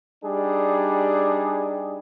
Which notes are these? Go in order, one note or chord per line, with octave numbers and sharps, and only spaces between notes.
G3 D4 D#4 G4 G#4